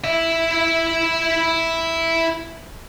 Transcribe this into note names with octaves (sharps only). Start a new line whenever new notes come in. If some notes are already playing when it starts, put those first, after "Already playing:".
E4 E5